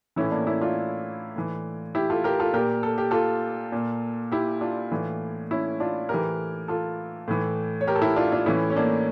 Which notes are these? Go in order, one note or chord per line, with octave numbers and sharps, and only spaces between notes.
A2 E3 C#4 E4
A#3 D4
C#4 E4
D4 F4
A2 E3
E4 G4
F4 A4
G4 A#4
F4 A4
A#2 G4 A#4
A4
G4
F4 A4
A#2
E4 G4
D4 F4
A2 E3
C#4 E4
D4 F4
A2 E3 G4 A#4
F4 A4
A2 E3
C#5
G4 A#4
A4
E4 G4
D4 F4
D4 F4
A2 E3 C#4 E4
C#4
A#3 D4